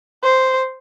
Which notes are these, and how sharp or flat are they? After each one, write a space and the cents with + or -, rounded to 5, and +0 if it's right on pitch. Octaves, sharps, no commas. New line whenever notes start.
C5 -5